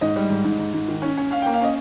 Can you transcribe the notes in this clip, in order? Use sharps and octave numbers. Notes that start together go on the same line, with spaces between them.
G#2 D#5
G3
G#2
G#2
G#2
G#2
D#3
C#4
C#4
C#4 F5
A#3 G5
F5
C#4 D#5